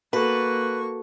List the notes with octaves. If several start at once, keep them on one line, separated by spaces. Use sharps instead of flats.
A#3 F#4 A4 B4 A5 C#6